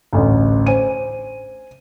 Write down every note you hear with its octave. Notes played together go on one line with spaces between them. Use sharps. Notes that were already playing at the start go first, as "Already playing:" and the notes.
A1 D2
C5 G#5 D#7